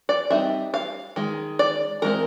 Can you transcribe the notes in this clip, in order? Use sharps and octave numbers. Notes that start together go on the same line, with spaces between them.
D5
G3 C4 D#4 E5
F5
D#3 G#3
D5
E3 G#3 C4 A#4